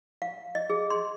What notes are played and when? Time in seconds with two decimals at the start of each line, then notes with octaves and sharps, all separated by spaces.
0.22 F5
0.55 D#5
0.70 G#4
0.90 C6